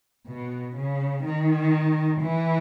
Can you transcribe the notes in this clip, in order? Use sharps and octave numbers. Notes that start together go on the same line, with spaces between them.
B2
C#3
D#3
E3